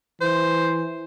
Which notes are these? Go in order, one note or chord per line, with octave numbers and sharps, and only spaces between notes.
E3 C5